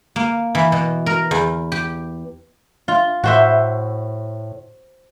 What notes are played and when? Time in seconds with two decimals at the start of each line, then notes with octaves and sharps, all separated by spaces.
0.16 A#3
0.55 E3
0.72 B2
1.06 A#4
1.31 E2
1.72 G4
2.88 F4
3.24 A2 F#4 C5 E5